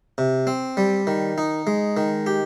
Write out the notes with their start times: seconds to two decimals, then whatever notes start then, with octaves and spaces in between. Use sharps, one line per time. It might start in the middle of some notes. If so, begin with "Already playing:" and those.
0.18 C3
0.47 C4
0.77 G3
1.07 D#3
1.38 D#4
1.67 G#3
1.97 D#3
2.26 G4